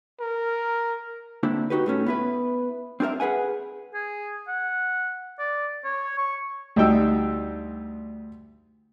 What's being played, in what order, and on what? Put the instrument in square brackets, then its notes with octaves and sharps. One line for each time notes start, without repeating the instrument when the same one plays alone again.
[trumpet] A#4
[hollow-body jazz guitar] D3 A#3 C4 D4 E4
D#4 F#4 G4 B4
A2 A3 C#4
B3 E4 B4
C4 D4 G#4 A#4 E5
G#4 B4 F#5 G#5
[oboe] G#4
F#5
D5
C#5
C#6
[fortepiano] D2 G3 D#4 G5 E6